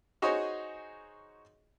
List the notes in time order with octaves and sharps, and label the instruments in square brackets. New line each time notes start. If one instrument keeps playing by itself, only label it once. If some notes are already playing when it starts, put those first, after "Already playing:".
[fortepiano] D#4 F#4 G#4 C5 C#5 D#5